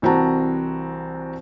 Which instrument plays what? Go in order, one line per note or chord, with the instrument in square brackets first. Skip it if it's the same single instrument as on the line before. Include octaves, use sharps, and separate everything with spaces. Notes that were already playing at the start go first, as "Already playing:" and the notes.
[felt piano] C2 E3 C4 F#4 A5 A#5